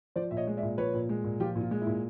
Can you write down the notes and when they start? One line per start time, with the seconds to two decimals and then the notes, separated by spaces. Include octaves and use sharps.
0.16 F3 C5 D5
0.31 A#2 E5
0.37 C#5 D#5
0.47 G#3
0.57 D5 E5
0.63 A#2
0.78 F3 B4 C#5
0.94 A#2
1.09 G#3
1.24 A#2
1.40 F3 F4 G4
1.56 A#2
1.61 F4
1.71 G#3
1.82 E4
1.87 A#2